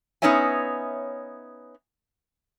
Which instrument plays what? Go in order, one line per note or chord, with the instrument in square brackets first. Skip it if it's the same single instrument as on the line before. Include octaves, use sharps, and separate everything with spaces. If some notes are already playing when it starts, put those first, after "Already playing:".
[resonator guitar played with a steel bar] B3 C#4 D#4 C#5 E5 G#5